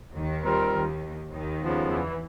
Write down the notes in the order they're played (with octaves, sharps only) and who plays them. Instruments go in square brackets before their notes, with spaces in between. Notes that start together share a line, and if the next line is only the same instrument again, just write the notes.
[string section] D#2 D#3
[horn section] G3 C4 F4 A#4
[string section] D#2 D#3
D#2 D#3
[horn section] C#3 F3 G#3 B3
[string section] E2 E3